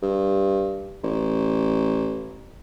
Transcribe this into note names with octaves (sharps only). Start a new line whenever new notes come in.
G2
A1